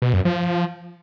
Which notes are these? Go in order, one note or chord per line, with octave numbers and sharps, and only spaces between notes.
B2
F#2
F3